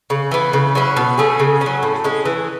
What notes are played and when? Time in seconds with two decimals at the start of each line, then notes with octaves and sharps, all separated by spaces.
0.10 C#3
0.31 E3 B3
0.53 C#3
0.75 F#3 C#4 E4
0.97 B2
1.18 A3 C#4 G#4
1.40 C#3
1.61 C#4
1.66 F#3
1.83 A2
2.04 G#3 C#4
2.25 E3